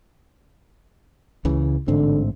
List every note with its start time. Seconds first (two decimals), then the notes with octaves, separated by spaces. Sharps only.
1.45 C#2 C#3 E3
1.88 A1 G#2 D3 C4